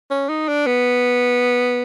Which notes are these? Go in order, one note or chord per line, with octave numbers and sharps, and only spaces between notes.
C#4
D#4
D4
B3